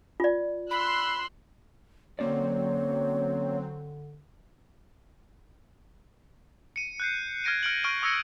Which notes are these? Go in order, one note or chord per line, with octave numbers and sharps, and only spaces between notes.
F4 D5
B5 C6 E6 F#6
D3 F#3 A#3 C4 C#4 C#5 D5
C#7 D#7
F#6 G6 C7
F6 G#6 A#6 D7 D#7
F6 D7 F#7
C#6 F6 A#6 D7 D#7
C#6 D#6 E6 G#6 A#6 C#7